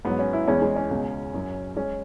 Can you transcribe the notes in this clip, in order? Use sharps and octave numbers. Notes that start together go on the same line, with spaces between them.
G#2 F#3 B3
C#4
E4
E2 E3 G#3 C#4
G#3
C#4
C#2 B2 G#3
F#2 F#3
G#3 C#4